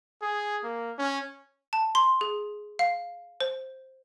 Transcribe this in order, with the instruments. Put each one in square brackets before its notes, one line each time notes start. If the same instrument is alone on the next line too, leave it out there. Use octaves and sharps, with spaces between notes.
[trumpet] G#4
A#3
C#4
[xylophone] A5
C6
G#4
F5
C5